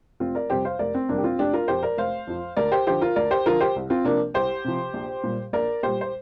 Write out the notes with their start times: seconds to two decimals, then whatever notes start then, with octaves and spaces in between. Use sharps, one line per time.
0.20 F1 C4 F4
0.35 A#4 D5
0.50 F2 C3 G3 G4 C5
0.65 C5 F5
0.79 F1 A#4 D5
0.94 C4
1.09 F2 C3 G3 A#3 D4
1.18 G4
1.24 C4 F4
1.39 F1 D4 G4
1.53 F4 A#4
1.68 F2 F3 G4 C5
1.83 A#4 D5
1.97 F1 C5 F5
2.27 F2 F3
2.57 D2 A#4 D5
2.72 G4 C5
2.87 D3 F3 G4 C5
3.01 F4 A#4
3.16 D2 A#4 D5
3.31 G4 C5
3.46 D3 F3 F4 A#4
3.61 G4 C5
3.76 C2
3.90 C4 F4
4.05 C3 F3 A#3 D4
4.34 C2 G4 C5
4.65 C3 F3
4.93 A#1
5.23 A#2 G3
5.53 A#1 A#4 D5
5.83 A#2 G3 G4 C5
6.01 C5